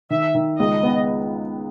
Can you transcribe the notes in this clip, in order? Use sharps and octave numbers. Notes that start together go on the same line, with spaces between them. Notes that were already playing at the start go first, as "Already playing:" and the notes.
D#3 E5
D#3
C#2 D#5
B3